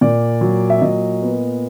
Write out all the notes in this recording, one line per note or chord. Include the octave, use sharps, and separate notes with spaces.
A#2 D5
F#3
E5
A#2 D#5
B3